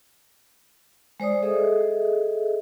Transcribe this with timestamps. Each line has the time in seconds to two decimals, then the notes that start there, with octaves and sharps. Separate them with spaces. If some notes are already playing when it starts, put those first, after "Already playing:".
1.20 G#3 C5 D5 D#6
1.43 G#4 A4 D#5 E5